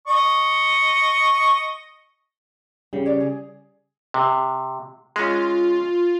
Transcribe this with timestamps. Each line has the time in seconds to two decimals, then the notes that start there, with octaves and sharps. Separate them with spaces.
0.08 D#5 C#6
2.93 C#3 G3 G5
3.06 C#5 D5
3.20 G#4
4.14 C3
5.16 G#3 C#4 F4